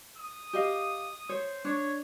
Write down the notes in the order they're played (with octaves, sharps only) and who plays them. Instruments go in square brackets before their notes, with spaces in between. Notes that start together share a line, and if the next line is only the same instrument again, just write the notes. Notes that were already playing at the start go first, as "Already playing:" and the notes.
[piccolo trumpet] D#6
[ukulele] G4 D#5 F5
[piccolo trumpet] C5 [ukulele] C#5
[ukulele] D4 [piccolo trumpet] C#5